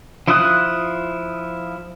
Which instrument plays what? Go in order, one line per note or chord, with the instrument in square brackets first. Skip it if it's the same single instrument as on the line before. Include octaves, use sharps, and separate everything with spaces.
[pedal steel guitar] F3 E4 F4 D#6 F#6